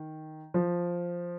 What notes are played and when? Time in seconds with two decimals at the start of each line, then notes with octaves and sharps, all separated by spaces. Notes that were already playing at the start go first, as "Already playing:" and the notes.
Already playing: D#3
0.54 F3